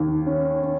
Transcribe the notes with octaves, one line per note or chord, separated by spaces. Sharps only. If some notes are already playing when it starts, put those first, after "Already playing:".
Already playing: D#2
C#4
C#4